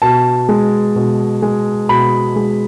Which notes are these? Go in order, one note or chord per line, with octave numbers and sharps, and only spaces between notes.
B2 A5
G#3
B2
G#3
B2 B5
G#3